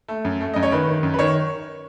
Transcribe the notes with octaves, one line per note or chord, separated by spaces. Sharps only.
A3
F#2
A3
F#2 D#5
C#5
D#3 B4
D#3
F#2
B4
D#3 C#5